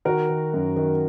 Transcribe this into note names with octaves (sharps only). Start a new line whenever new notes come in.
D#3 F#4 A#4
D#3
F#2
D#3